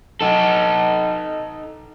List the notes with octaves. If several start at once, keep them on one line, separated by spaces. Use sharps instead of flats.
D#4 A4